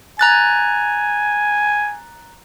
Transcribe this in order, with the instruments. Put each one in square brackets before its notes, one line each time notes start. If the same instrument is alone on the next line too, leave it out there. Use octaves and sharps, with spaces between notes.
[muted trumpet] G#5 [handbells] A#5 F#6 A6